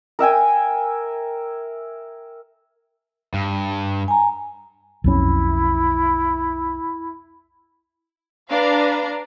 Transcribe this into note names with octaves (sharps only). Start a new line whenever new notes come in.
A#4 E5 G5 G#5
G2
G#5 A#5
B1 F2 C#4 E4
D4 B4 F5 A#5